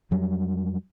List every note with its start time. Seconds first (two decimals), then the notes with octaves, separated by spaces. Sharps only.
0.11 F2 F#3 G3